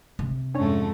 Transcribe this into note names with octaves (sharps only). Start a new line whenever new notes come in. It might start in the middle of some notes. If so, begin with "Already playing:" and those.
C3
F2 G#2 A3 C#4 D4 C#5